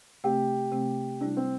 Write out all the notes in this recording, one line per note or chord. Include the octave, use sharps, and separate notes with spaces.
C3 A3 C4 G4
C3 A3 C4
C3 G3 D4 E4
C4